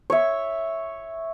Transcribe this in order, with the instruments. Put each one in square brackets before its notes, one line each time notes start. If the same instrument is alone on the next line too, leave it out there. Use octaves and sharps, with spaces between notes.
[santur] C#5 E5